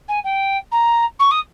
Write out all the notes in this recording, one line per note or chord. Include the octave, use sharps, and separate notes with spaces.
G#5
G5
A#5
C#6
D#6